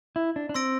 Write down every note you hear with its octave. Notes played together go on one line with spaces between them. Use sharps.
E4
D4
D4
C4 C6 E6 A#6 D7